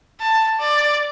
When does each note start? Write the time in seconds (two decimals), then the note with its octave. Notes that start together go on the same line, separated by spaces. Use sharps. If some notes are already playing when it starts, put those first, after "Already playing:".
0.21 A5
0.60 D5